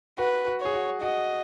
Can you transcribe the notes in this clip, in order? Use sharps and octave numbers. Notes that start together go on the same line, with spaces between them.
F#4 B4
F#4
G#4 C#5
F#4
F#4 D#5